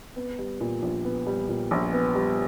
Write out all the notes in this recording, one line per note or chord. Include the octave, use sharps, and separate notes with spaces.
B3
G3
A#2
A#1
B3
G3
A#2
A#1
B3
G3